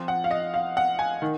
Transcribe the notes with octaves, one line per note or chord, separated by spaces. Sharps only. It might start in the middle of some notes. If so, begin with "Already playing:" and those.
Already playing: F3 C4 F4
F#5
F5
D#5
F5
F#5
G#5
D#3